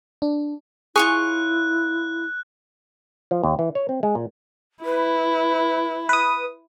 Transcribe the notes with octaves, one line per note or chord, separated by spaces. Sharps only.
D4
E4 F4 G#4 C#5 C#6 F#6
F3
D#2
E3
C#5
C4
G#3
A#2
E4 B4
B4 D#6